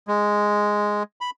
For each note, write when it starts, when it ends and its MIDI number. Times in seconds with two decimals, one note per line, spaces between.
0.08 1.03 56
1.21 1.30 83